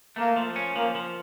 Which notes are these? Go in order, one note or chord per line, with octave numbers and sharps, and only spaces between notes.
A3 A#3
F3
C#4
F3 A#3
F3